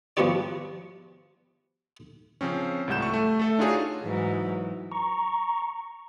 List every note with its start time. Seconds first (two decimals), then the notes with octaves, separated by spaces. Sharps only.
0.17 F3 G3 B3 F#4 G4 D5
2.41 C#3 F3 C4 C#4
2.88 C#2 A2 G3 F#5 G6 E7
3.02 A3 C#6
3.14 A3
3.39 A3 A4 E5
3.59 D4 D#4 F4 F#4 G#4 C#5
4.04 G#2 E3 F#3
4.92 A#5 C#6